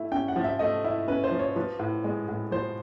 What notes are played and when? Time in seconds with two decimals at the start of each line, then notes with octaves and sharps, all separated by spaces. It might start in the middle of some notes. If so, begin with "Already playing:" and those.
Already playing: A3 E4
0.12 C#4 G5
0.28 F#5
0.36 F3
0.44 E5
0.59 A3 D#5
0.84 E4
1.08 C#4 B4
1.24 C5
1.31 F3
1.39 C#5
1.56 F3 B4
1.79 A2
2.04 G#3
2.28 A2
2.51 F3 C5